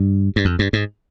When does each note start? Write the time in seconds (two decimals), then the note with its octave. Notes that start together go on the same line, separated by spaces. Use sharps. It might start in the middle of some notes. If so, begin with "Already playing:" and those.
Already playing: G2
0.36 G2
0.45 F2
0.59 G2
0.73 G#2